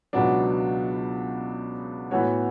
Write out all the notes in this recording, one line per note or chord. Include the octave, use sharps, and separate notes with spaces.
C#2 B2 F#3 B3 D4
A2 E3 B3 F#4 C#5